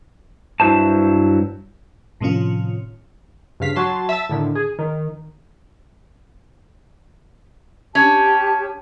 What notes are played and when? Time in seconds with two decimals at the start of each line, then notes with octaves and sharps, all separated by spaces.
0.60 G2 F#3 E4 C5 A5
2.21 A2 C3 D#3 F3 C#4 F4
3.60 G2 C#3 F5 B6
3.76 F#3 A5 C6
4.09 E5 A5
4.29 A2 D3 D#3
4.55 G#4
4.79 D#3
7.95 C#4 G4 A5